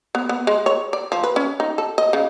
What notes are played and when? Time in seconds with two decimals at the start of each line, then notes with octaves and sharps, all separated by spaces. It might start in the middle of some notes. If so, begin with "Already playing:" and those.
0.15 B3
0.29 B3
0.47 G#3
0.66 C#5
0.93 D5
1.12 F3
1.24 B4
1.36 C#4
1.60 D#4
1.78 A4
1.98 D#5
2.13 C#3